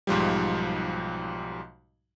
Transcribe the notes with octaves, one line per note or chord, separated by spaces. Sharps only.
B1 G#2 F3 G3